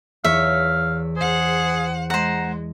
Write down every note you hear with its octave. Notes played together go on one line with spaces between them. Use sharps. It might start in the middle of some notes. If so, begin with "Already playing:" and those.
E2 C#5 E5 F5
G#4 C5 F#5
G#3 C5 F#5 A#5